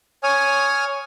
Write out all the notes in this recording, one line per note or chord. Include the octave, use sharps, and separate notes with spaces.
C#5 G#5 D#6 F6